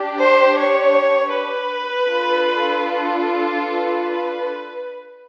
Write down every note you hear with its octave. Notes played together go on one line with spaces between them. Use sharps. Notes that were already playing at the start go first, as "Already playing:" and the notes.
Already playing: D4 G4
C5
C#5
B4
D4 F4 A4
B4